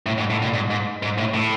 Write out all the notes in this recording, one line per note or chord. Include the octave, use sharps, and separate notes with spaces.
A2
G#2
A2
A#2
G#2
G#2
G#2
A2
A2